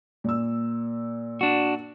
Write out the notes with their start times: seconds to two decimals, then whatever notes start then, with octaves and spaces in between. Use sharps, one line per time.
0.24 A#2 E6
1.41 D4 F#4